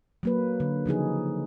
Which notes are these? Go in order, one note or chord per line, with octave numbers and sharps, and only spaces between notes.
F#3 A#3 B4
D3
C#3 F3 D#4 G#4